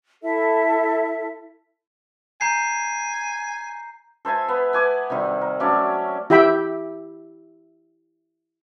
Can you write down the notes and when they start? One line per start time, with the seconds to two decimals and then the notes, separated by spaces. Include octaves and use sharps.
0.22 E4 A4 E5
2.41 G#5 A#5 G6 C7
4.25 A4 C5 E5 G#5
4.48 B3
4.73 B3 G#5 D6
5.10 C3 D#3 G3
5.41 A#4
5.60 F#3 A3 C#4 D5
6.30 E4 G4 E5 G5 B5